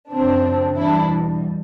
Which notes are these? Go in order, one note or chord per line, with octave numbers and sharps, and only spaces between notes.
F#2 C#3 F3 C4 D4
E2 B2 G3 D4 E4